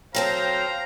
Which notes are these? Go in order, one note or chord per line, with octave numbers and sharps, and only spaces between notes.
F#3 C4 A4 C5 F5 G5 A#5